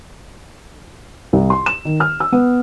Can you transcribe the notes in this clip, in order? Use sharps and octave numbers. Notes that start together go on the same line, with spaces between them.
C2
C6
E7
D#3
F6
E6
B3